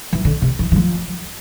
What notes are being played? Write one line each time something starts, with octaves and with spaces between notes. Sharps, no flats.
E3
D3
C3
E3
E3
F3